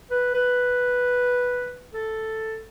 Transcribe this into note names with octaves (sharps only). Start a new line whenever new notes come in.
B4
B4
A4